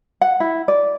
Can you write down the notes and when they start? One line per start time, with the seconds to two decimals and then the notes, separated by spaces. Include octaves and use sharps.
0.21 F#5
0.40 E4
0.68 D5